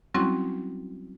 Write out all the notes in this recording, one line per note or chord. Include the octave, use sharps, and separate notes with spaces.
F#3 G3 C4 C#4 E4 F#4